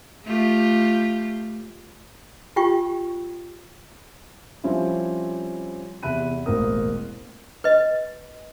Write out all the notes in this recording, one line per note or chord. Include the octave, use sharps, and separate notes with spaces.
A3 F4 G4
F4 G4 G5 C#6
F3 G3 C4 C#4 E4 F4
E2 C3 E5 B5 F#6 D#7
E1 A1 A#3 C4 A#4 D#6
B4 D#5